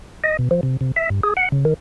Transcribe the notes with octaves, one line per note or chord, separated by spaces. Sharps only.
D#5
B2
F3
C3
C3
E5
G2
G#4
F#5
C#3
D#3